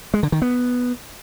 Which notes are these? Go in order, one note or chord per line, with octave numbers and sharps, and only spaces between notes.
G#3
D3
D#3
B3